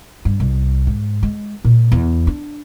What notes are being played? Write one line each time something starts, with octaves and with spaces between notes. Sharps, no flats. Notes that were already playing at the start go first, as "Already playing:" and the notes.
G2
C2
G#2
G#3
A#2
E2
D4